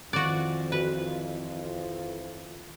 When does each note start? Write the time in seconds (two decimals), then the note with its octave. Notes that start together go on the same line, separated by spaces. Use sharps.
0.13 F2 D#3 E3 F4 F#4 D5
0.72 F#4 B4